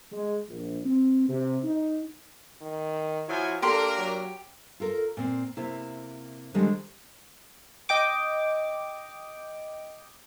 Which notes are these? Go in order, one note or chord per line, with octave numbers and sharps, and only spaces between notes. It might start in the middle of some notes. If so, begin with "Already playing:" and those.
G#3
A#1
C4
C3
D#4
D#3
F3 F#3 E4 G#5
A#3 D4 G4 A4 A#4 C6
F#3
F4 A4 A#4
A#2 C4
C3 A#3 E4
D3 D#3 F3 G3 G#3
D#5 G5 D6